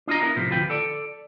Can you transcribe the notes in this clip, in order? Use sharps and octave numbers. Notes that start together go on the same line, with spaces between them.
D4 F4 D#5 A#5
B3 E4 A#4
A2 C3 F3
D2 F3 F4 B4 G5
A4 D5